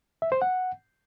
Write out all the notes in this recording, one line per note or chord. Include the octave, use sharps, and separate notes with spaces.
E5
C5
F#5